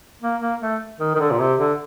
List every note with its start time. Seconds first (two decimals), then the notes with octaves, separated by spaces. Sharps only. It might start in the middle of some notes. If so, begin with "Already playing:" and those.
0.22 A#3
0.41 A#3
0.61 A3
1.00 D#3
1.15 D#3
1.20 D3
1.31 A#2
1.40 C3
1.59 D3